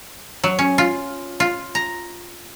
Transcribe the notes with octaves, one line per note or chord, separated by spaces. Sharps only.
F#3
C#4
F4
F4
A#5